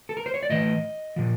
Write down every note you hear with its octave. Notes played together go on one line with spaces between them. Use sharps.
A4
A#4
C5
C#5
D5
A2 E3 D#5
A#2 F3